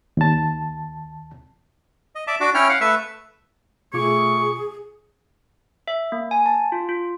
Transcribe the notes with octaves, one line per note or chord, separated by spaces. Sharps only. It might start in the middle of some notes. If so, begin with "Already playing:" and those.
D#2 A5
D#5
D5 E5 A5 D6
D4 F#4 D6
C#4 E4 C#5 G5 F6
F5 F#5
A3 B4 E5 E6
B2 A3 F4 G#4 C#6 D6
E5
A#3
G#5
A5
F4
F4